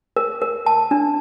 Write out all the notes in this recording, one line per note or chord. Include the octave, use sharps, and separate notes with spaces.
A#4
A#4
A5
D4